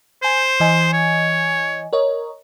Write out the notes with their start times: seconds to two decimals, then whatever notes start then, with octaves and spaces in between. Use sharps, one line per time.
0.22 C5 G#5 G6
0.60 E3 D#5 G#5
0.93 C#5
1.93 A#4 C#5 D#5